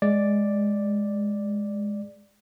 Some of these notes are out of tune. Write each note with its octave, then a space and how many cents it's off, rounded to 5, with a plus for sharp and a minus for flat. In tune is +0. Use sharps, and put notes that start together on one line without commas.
G#3 +0 D5 +0